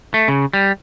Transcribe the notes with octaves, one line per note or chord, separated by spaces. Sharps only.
A3
C#3
G3